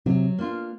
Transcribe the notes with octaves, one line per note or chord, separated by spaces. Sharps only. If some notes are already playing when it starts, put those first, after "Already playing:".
C3 F#3
A#3 D4 F4